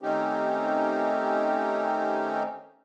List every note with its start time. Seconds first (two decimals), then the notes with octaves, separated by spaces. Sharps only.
0.02 D#3 A3 C4 C#4 D#4 G4